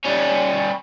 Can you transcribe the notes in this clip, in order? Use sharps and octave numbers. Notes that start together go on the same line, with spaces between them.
G3 C#4